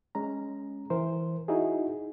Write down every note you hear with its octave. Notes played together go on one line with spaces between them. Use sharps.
G#3 C#4 A#5
E3 A#4 C5
D#4 E4 F#4 G#4